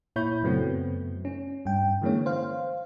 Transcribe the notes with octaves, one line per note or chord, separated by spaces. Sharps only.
A#2 E4 C#5 B5 G6
F#2 C#3 F#3 A3 B3 C4
C#4
G2 G5
D3 E3 G#3 A#3 C#4 C#5
C5 F5